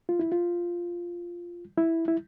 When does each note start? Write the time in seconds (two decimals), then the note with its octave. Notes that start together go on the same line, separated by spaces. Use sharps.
0.09 F4
0.20 E4
0.32 F4
1.77 E4
2.08 E4